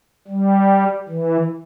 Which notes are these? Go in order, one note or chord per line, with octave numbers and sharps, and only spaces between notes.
G3
E3